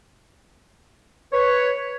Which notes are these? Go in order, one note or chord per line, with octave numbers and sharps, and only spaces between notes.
B4 C#5